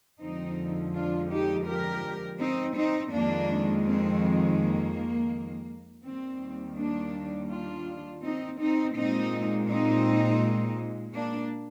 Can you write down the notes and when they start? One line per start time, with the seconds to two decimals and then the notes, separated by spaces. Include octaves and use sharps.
0.21 F2 D3 F3 G#3 C4 D#4
0.94 D4 F4
1.31 D#4 G4
1.67 G4 A#4
2.40 C4 D#4
2.76 C4 D#4
3.13 F2 D#3 G#3 A#3 D4
3.86 C4
4.59 A#3
6.04 D#2 D#3 G3 C4
6.77 A#3 D4
7.50 D4 F4
8.23 C4 D#4
8.60 C4 D#4
8.96 A#2 G#3 C4 D#4
9.69 C4 D#4
11.15 A#3 D4